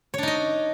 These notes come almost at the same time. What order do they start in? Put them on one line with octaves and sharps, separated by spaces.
C#5 D4 D#4 D#5